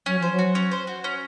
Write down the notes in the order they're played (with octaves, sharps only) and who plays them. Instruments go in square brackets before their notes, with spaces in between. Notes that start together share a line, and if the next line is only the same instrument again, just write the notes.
[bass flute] F#3 [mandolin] C#4
[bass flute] F3 [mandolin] C5
[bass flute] F#3
[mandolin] F#4
C#4
C5
F#4
C#4